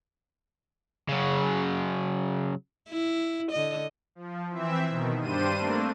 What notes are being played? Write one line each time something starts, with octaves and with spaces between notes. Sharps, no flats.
C#3 F#3
E4
D3 D#5
F3
E3 C4 E5
B2 D#3
G2 G3 D4 C5 D#7
A3 A#3 C4 D4